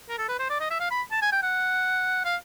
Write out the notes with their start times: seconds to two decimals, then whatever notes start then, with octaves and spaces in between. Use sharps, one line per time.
0.09 A#4
0.18 A4
0.29 B4
0.39 C5
0.50 D5
0.60 D#5
0.70 E5
0.80 F5
0.91 B5
1.11 A5
1.22 G#5
1.32 G5
1.42 F#5
2.25 F5